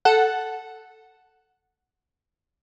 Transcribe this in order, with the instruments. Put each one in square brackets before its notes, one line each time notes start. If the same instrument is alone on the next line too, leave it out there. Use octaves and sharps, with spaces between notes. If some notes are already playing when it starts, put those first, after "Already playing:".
[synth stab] A4 F#5